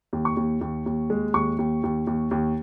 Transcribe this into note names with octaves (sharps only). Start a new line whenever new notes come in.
D#2
C#6
D#2
D#2
D#2
G#3
D#2 C#6
D#2
D#2
D#2
D#2